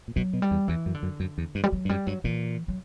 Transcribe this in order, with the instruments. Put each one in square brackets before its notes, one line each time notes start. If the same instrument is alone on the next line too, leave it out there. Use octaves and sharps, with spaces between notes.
[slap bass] A#2
[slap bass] B2 [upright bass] F#3
[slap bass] B2
[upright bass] G3
[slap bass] E2
[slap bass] E2 [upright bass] E3
[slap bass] F#2
[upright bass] D3
[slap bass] F#2
F#2
E2
G2
[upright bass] G3
F#3
[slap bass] G2
[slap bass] F#2 [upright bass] G3
[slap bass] G2 [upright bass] F#3
[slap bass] A#2 [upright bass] E3
[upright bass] F#3